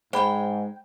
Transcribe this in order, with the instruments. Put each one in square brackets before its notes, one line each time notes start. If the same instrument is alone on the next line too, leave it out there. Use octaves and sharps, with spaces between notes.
[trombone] G#2 [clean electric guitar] G#3 [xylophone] C5 B5 [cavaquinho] G5